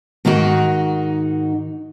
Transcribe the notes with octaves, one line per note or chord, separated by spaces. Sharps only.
G#2 D#3 D#4 F#4